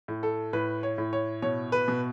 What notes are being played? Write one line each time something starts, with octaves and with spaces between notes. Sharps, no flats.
A2
A4
A2 B4
C#5
A2
C#5
B2 C#5
B4
B2